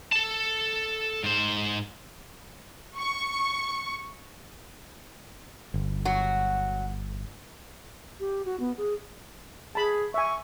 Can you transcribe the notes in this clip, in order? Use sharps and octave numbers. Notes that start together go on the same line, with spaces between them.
A4 A5
G#2 C5
C#6
G1
F#3 F#4
G4
F#4
B3
G#4
G#4 A5 B5
E5 G#5 C#6